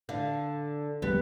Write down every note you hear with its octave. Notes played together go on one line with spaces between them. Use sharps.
D3 F5
A#1 D#2 G3 B3